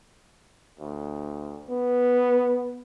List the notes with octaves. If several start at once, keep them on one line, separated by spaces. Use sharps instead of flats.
D2
B3